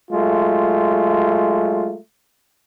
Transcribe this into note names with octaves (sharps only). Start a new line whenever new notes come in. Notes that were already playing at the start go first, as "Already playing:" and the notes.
F#3 G#3 A3 F4